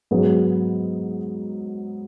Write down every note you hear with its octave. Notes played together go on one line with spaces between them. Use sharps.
G#2 F#3 B3 G#4 B4